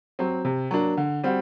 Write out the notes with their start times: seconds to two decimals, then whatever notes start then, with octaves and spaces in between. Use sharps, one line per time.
0.19 F#3 C4
0.45 C3
0.71 F#3 A#3 D4
0.97 D3
1.24 G3 C4 F#4